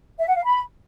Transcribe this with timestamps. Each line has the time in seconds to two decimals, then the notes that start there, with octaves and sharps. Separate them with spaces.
0.19 E5
0.27 F#5
0.36 F5
0.44 B5